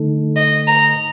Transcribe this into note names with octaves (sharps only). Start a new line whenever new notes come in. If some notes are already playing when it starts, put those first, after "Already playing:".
Already playing: D3 A3 D#4 A4
D#5
A#5